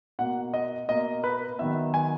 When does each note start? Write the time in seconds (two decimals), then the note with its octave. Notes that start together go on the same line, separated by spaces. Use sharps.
0.19 B2 A#3 F#5
0.54 D#5
0.89 B2 A#3 D#5
1.24 B4
1.59 D#3 F#3 B3 E5
1.94 G#5